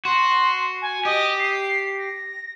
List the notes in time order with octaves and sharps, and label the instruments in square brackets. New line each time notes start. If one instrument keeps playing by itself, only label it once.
[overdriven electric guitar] F#4 [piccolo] C6
[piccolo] G#5
[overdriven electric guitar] G4 [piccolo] D#5
[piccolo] C7
A#6